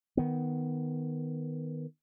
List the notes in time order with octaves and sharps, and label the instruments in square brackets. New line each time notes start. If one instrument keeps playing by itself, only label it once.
[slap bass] D#3 B3